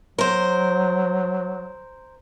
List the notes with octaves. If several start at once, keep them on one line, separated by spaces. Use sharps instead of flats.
F#3 A#4 C5